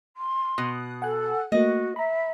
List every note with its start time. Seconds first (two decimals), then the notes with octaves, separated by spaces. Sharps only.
0.16 C6
0.58 B2 D#6 F#6
1.02 A4 F#5 G#5 F#6
1.52 A3 A#3 F#4 D#5
1.96 E5 A#5 B5